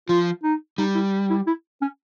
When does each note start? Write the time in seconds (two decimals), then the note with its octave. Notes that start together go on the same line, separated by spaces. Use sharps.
0.09 F3 F4
0.43 D#4
0.78 G3 D#4
0.95 E4
1.30 E4
1.47 E4
1.82 C#4